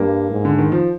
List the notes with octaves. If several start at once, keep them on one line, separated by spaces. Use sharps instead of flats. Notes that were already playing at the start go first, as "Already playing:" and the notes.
Already playing: G2 A#3
G#2
D3
D#3
F3